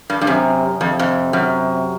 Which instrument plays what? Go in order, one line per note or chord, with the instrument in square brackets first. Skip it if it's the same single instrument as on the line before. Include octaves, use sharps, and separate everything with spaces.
[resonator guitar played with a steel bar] G2
G2
[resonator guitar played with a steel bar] F#2 [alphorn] C3
[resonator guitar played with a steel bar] F2 [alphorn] C3
[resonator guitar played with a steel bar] F2
F#2